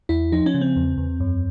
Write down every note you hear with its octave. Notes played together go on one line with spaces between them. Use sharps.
E2 E4
F3 D#4
C#4
C#3
C4
E2
E2
F#2